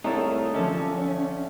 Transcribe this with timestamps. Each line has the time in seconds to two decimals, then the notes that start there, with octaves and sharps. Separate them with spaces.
0.04 C2 D#3 G#3 A3 D#4 E4 C#5 A6
0.54 D3 F3 C#4 A4 E5